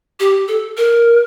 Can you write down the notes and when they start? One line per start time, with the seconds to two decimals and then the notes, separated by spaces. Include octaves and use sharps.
0.20 G4
0.48 A4
0.77 A#4